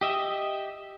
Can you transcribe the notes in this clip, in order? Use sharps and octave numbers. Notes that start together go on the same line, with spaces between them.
G4 D#5 E5